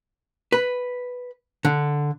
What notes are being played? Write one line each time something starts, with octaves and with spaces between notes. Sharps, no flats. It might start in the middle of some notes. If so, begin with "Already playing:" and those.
B4
D3